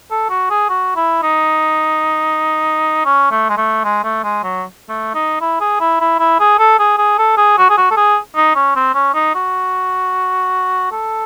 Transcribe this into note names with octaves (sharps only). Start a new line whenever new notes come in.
A4
F#4
G#4
F#4
E4
D#4
C#4
A3
G#3
A3
G#3
A3
G#3
F#3
A3
D#4
E4
G#4
E4
E4
E4
G#4
A4
G#4
G#4
A4
G#4
F#4
G#4
F#4
A4
G#4
D#4
C#4
C4
C#4
D#4
F#4
A4